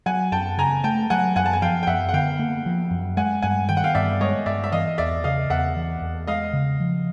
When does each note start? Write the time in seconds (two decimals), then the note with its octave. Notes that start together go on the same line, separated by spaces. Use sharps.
0.06 F#3 F#5 G#5
0.32 F#2 G5 A5
0.58 C#3 G#5 A#5
0.84 A3 G5 A5
1.10 F#3 F#5 G#5
1.36 F#2 F#5 G#5
1.46 A5
1.53 G#5
1.62 F3 F5 G5
1.83 G5
1.87 F#2 E5 F#5
2.09 F#5
2.13 D3 F5 G5
2.39 A#3
2.66 F3
2.91 F#2
3.17 G#3 F#5 G#5
3.42 G2 F#5 G#5
3.69 D#3 G5
3.77 F#5
3.84 F5 G5
3.95 G2 D5 E5
4.21 G#3 C#5 D#5
4.46 G2 D5 E5
4.64 E5
4.72 E3 D#5 F5
4.98 E2 D5 E5
5.24 C#3 D#5 F5
5.50 E2 E5 F#5
5.76 E3
6.01 E2
6.27 G#3 D#5 F5
6.53 C#3
6.80 F3